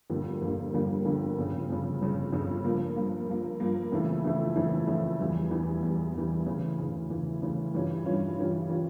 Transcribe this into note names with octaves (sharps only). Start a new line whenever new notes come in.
G1 F2 D3 G3 A#3
G1 F2 D3 G3 A#3
G1 F2 D3 G3 A#3
G1 F2 D3 G3 A#3
G1 F2 C#3
G1 F2 C#3
G1 F2 C#3
G1 F2 C#3
G2 F3 A#3
G2 F3 A#3
G2 F3 A#3
G2 F3 A#3
F2 C#3 E3 A3 E4
F2 C#3 E3 A3 E4
F2 C#3 E3 A3 E4
F2 C#3 E3 A3 E4
E2 E3 G3
E2 E3 G3
E2 E3 G3
E2 E3 G3
D2 C#3 E3
D2 C#3 E3
D2 C#3 E3
D2 C#3 E3
G2 E3 G3 C#4 F4
G2 E3 G3 C#4 F4
G2 E3 G3 C#4 F4
E3 G3 C#4 F4